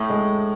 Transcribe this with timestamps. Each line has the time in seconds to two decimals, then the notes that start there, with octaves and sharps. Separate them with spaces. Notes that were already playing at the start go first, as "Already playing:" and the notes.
Already playing: A2 A3
0.10 G#3